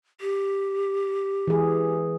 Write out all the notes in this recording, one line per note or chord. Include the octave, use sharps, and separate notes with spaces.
G4
E3 G#4